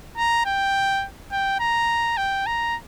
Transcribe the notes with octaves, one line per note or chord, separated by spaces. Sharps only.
A#5
G5
G5
A#5
G5
A#5